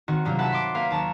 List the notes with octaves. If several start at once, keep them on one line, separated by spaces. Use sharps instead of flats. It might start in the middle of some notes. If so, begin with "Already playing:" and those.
D#3 C4 F#4
G2 C3 F#3 A#3 F4
E5 F#5 A5 B5
C6 D6
A#3 B4 F5
D#2 A5 A#5 C#6